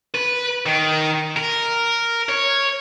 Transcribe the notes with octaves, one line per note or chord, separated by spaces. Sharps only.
B4
D#3
A#4
C#5